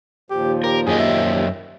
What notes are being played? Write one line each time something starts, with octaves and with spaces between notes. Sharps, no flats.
D#2 A#2 F3 G4
G4 A#4
F#2 G4 G#4 D#5
E5